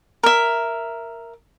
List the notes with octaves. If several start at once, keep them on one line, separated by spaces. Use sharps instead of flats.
A#4 E5